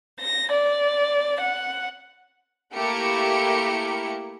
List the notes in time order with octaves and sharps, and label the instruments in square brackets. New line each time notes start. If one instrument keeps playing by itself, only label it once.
[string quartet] A#6
D5
F#5
[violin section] A3 A#3 E4 G4 A#4 C#7